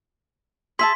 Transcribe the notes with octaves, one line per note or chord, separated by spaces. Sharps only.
G#4 E5 A5 C6 B6